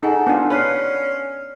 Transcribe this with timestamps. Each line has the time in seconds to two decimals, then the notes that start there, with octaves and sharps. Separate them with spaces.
0.03 D#4 G#4 A4 F#5 G#5
0.27 B3 D4 F4
0.50 C#4 B4 D5 F6 C7